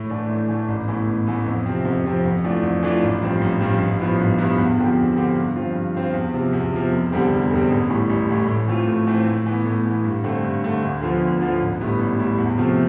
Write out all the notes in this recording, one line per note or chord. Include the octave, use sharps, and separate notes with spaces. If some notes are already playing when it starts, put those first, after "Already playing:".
Already playing: A2
E3 A3 D4
A2
E3 A3 D4
A1
A2 E3 B3
A1
A2 E3 B3
F2
C3 F3 C4
F2
C3 F3 C4
F2
E3 A3 D4 F4
F2
E3 A3 D4 F4
A1
G2 F3 C4
A1
G2 F3 C4
A1
G2 F3 B3 E4
A1
G2 F3 B3 E4
E2
D3 F3 C4 G4
E2
D3 F3 C4 G4
G2
F3 C4 F4
G2
F3 C4 F4
E2
C3 F3
E2
C3 F3
F1
E2 D3 G3 C4
F1
E2 D3 G3 C4
A1
A2 E3 G3
A1
A2 E3 G3
A2
E3 A3 C4 F4
A2
E3 A3 C4 F4
A2
E3 B3
A2
E3 B3
G2
D3 A3 C4
G2
D3 A3 C4
D2
D3 F3 B3 F4
D2
D3 F3 B3 F4
A1
A2 G3 B3 E4
A1
A2 G3 B3 E4
E2
C3 F3 A3 C4